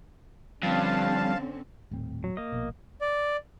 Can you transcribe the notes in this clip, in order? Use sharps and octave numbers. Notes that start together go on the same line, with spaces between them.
G2 D3 F3 C4 C#4 F5 A5
D#1 A2 C4
F#3
A#3 D#5
A#1 B2
D5